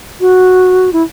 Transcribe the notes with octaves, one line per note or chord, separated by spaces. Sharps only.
F#4
E4